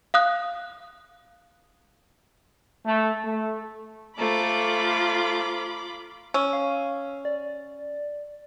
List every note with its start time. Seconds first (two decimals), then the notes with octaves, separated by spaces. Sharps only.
0.14 F5 D#6 F#6
2.85 A3
3.24 A3
4.18 A3 F4 A4 C5 A#5 B5 D6
6.34 C#4 E6
6.53 F5
7.25 D5